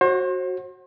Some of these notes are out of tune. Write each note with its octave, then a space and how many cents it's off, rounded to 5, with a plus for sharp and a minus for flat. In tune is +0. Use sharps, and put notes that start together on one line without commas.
F#4 +0 C5 +40